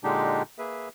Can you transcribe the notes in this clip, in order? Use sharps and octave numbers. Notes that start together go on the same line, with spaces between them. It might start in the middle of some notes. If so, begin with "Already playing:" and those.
A#2 D3 G#3 D4 D#4 G4
A#3 G#4 B4 E5